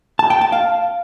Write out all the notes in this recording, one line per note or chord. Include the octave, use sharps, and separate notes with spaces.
A5
G5
A5
F5